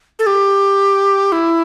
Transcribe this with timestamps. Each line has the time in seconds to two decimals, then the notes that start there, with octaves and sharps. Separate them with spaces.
0.19 A4
0.26 G4
1.32 E4